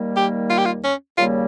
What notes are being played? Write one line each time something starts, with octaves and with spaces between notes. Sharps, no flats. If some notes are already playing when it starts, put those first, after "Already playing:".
Already playing: D#2 D#3 G3 A#3
G4
F4
G4
F4
C#4
D#2 C#3 G3 A#3 F4